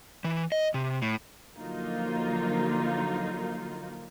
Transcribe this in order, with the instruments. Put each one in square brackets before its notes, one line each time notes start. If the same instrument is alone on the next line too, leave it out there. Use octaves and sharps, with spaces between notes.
[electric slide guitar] E3
D#5
C3
A2
[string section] D3 F3 F#3 A#3 D#4 F4